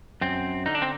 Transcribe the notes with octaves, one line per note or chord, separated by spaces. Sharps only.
F#2 C4
D3 D#4
D4
C4